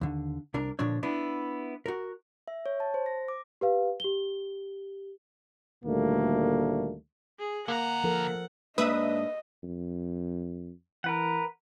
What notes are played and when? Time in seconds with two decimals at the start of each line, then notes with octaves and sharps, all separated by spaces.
0.01 D#2 D3
0.54 C2 D4 A#4
0.79 A#2 D3 F3 D4 C#5
1.03 B3 D4 E4
1.86 F#4 A#4
2.48 E5
2.66 C#5
2.80 A5
2.94 C5
3.06 A#6
3.28 D6
3.61 G4 B4 F5
4.00 G4 G7
5.84 D2 A#2 D#3 G3 A3 A#3
7.39 G#4
7.68 D3 A#3 F#5 A#5
8.04 F3 A4 A#4
8.78 G#2 A#3 D4 B4 D#5 E5 B5 D#6
9.63 F2
11.04 E3 A#4 B4 F#5